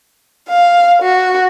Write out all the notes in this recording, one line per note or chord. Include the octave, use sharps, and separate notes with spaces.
F5
F#4